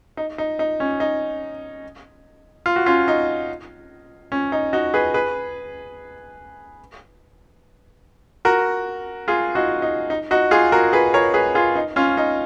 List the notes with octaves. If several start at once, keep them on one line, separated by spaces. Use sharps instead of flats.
D#4
D#4
D#4
C#4
D#4
F4
F#4
C#4 F4
D#4
C#4
D#4
D#4 F#4
G#4 B4
G#4 B4
F#4 A#4
F4 G#4
D#4 F#4
D#4
D#4
D#4 F#4
F4 G#4
F#4 A#4
G#4 B4
A#4 C#5
G#4 B4
F4 G#4
D#4
C#4 F4
D#4